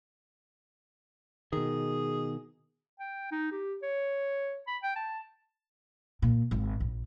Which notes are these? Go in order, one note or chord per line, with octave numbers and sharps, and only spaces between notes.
B2 D#3 G#4
G5
D#4
G4
C#5
B5
G5
A5
A#2
G#1
A#1